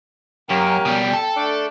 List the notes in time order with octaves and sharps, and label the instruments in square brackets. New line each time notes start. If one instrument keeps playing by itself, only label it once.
[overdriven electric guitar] F#2 [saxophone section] A#3 C#4 G4 [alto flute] G5
[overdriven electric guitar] B2 G3
A4
[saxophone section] A3 D4